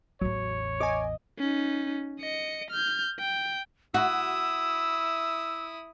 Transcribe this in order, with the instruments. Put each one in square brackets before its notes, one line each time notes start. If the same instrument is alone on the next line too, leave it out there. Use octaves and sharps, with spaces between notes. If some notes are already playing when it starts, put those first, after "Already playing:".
[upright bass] A1 E2 [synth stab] F#3 [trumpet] C#5
[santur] D#5 [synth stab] G#5 D6
[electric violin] C#4 D#4
D#5 C#7
F6 G6
G5
[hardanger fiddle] E4 D#6 [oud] F#4 [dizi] E6